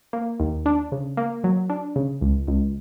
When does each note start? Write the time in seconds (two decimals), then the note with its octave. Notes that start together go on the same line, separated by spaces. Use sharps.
0.13 A#3
0.40 D#2
0.66 D4
0.92 C#3
1.17 A#3
1.44 F#3
1.70 D4
1.96 C#3
2.21 C#2
2.48 C#2